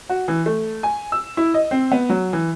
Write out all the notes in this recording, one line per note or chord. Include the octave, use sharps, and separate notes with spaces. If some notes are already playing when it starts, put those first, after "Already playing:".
F#4
E3
A3
G#5
E6
E4
D#5
C4
B3
F#3
E3